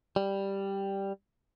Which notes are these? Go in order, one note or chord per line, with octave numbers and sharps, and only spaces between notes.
G3